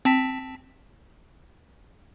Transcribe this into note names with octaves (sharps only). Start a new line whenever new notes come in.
C4 A5 B6